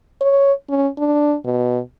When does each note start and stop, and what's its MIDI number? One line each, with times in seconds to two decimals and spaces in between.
0.21 0.52 73
0.69 0.88 61
0.98 1.35 62
1.45 1.80 47